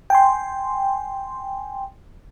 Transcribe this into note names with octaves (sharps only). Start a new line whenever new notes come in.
G5 G#5 C6